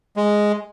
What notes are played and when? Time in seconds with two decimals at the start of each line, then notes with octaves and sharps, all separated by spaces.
0.16 G#3